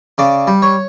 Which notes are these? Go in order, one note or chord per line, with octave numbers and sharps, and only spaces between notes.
C#3 D5
G3
C#5